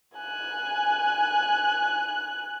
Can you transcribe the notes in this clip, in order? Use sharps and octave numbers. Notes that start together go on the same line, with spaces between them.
G#5 F#6